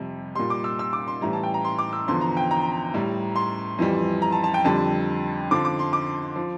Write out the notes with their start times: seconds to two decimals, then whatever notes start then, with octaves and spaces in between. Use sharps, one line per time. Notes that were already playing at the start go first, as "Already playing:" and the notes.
Already playing: F2 C3 G3
0.35 A#2 G3 C6
0.50 D6
0.64 E6
0.79 E6
0.93 D6
1.08 C6
1.21 A2 E3 G3 A#5
1.33 A5
1.43 G5
1.54 A#5
1.65 C6
1.78 D6
1.93 E6
2.08 E2 D3 F3 C6
2.21 A#5
2.37 G5
2.51 A#5
2.94 A2 G3
3.36 C6
3.79 F2 E3 G3
4.22 A#5
4.32 A5
4.44 A5
4.54 G5
4.64 F2 D3 G3 A5
5.51 F2 D3 F3 D6
5.65 D6
5.79 C6
5.93 D6
6.36 F3